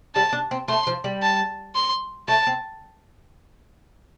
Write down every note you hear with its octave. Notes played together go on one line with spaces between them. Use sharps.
G3 A5
D4
C4
A3 C6
F3
G3
A5
C6
A3 A5
C4